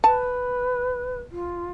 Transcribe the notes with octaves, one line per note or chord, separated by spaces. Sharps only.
B4 A5
F4